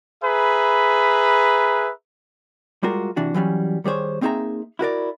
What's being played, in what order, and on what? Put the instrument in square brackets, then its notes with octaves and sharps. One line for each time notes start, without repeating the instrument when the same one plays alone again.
[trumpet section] G#4 B4 E5 A#5 B5
[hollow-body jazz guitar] G3 G#3 F4 F#4 A#4
C3 E3 D4 F#4
E3 F#3 G3 C#4
D#3 G3 G#4 C5 C#5
A#3 C4 D#4 G#4 E5 A#5
E4 F#4 A#4 D5